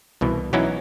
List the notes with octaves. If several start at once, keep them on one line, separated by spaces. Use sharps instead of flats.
C2 B2 E3
E3 F#3 B3 C#4 D#4 E4